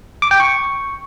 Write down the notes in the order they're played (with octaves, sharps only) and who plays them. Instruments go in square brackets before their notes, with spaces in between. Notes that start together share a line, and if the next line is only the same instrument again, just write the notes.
[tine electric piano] D6
G5
C#6